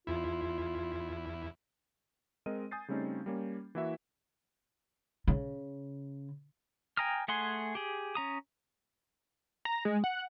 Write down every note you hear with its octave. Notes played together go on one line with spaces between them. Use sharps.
E2 E4 F4
G#3 C4 A#4 D#5 D#7
G#5 D#6 G6 A6 C7
C#3 G3 A3 C4 C#4 D#4
G3 A#3 C#4
E3 A#3 E4 F#4 E5
C#3
G5 G#5 A#5 D#6 F6
A3 G#4 F#5 G#5 C6
G4 G#4
C#4 A#5 D#6
A#5
G#3
F#5